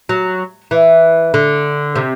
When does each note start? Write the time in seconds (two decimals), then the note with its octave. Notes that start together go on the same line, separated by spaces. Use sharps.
0.09 F#3
0.71 E3
1.34 D3
1.96 C3